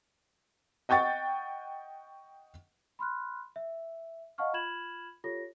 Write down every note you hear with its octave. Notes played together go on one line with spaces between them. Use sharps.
D#5 F#5 G5 C#6 A6
B5 C6 F6 F#6
E5
D#5 F5 F#5 A5 C#6 F6
F4 B5 F6 G#6 E7 F#7
F4 G4 A4 C#5 A#6